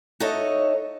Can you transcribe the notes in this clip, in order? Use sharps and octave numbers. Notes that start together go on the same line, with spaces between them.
D#4 F#4 A4 C#5 D#5 E5